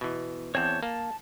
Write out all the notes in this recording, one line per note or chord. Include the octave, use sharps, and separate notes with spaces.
B2 E3
E2 C4 C#5 A5 G6
A#3 A5